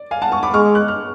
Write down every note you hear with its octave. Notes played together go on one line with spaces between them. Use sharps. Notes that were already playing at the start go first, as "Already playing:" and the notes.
Already playing: D5
F5 G#5
F#5 A5
A5 C#6
B5 D6
G#3 C#6 F6
F#6
F6